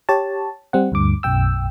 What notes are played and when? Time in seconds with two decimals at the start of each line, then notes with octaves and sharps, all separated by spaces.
0.09 G4 C#5 A5
0.73 G3 C4 F#5
0.92 D2 G2 D6
1.23 B1 F#2 G5 E6